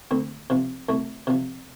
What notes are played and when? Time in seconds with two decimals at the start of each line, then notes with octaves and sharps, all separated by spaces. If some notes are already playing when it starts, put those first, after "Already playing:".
0.11 D2 C4
0.50 C3 F3
0.89 C2 A3
1.27 C3 F3